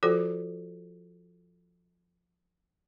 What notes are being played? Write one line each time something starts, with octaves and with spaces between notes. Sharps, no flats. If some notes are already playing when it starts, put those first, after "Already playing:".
F3 F4 F#4 A4 C5